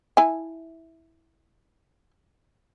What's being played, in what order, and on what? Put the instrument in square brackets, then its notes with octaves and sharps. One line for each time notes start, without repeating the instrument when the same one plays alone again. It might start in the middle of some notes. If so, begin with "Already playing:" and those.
[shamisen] E4 G#5